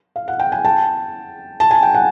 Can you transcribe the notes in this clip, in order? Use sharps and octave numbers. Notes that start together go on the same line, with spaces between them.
F5
F#5
G5
G#5
G5 A5
A5
G#5
G5
F#5 G#5